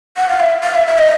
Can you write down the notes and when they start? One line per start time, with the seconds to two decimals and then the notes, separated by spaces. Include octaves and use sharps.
0.17 F#5
0.29 F5
0.40 E5
0.63 F5
0.75 E5
0.87 E5
0.98 D#5